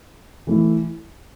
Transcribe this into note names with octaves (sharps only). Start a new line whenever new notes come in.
E3 A3 E4